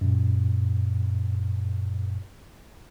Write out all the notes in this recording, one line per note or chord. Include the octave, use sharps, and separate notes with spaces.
F#2 A#2